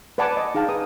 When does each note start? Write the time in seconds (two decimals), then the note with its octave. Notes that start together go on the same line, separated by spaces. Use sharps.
0.18 B4 D5 F#5 G#5 A5 D6
0.37 D#5
0.55 D#4 G#4 F5 G5 A5
0.69 B4 A#5 D#6